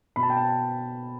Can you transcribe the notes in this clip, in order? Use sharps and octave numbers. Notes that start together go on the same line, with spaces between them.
B2 B5
A5
G5
A5